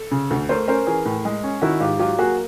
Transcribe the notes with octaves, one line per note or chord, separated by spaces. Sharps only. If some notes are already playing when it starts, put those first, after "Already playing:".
Already playing: A4
C#3
D2
A3 A#4 C5
C#4 A#4 C5
E3 G#4 A#4
A2
G#3
C#4
D#3 E4 F#4
G#2 F4 G4
F#3 F4 G4
A#3 F#4 G#4